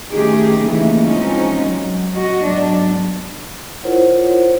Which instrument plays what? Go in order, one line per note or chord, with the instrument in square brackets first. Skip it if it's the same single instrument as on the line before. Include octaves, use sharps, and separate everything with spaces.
[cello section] D#3 A3 C#4 D#4 G4 G#4
C#3 E3 A3 A#3 D#4
F3 G#3 C4 C#4 D#4
F#3
F#4 D#5
G#2 F#3 B3 D4
[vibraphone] E4 F4 A#4 C5 C#5 F#5